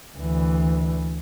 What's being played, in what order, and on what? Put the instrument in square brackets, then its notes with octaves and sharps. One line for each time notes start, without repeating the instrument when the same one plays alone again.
[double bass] D2 E3